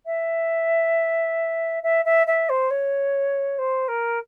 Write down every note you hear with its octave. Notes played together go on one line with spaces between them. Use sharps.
E5
E5
E5
E5
C5
C#5
C5
A#4